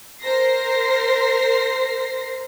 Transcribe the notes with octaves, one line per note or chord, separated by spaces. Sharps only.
A#4 C5 A#6 C7